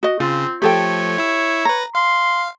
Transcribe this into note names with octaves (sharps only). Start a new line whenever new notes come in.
F#4 D#5
C#3 C4 F4
F3 A3 G4 A4 C#5 G5
E4 E6
B4 A#5 A#6
F5 C6